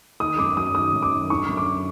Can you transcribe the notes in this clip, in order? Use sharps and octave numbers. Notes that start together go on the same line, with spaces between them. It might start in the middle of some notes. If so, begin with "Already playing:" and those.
D#3 D#6
F#2 D6
F#3 D#6
D#3 D#6
F#2
D6
D#3
D3 C#6
F#2
D6